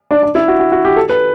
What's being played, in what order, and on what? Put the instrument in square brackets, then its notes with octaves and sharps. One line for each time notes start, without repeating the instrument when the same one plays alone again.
[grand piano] D4
D4
E4
F#4
F#4
F#4
G4
A4
B4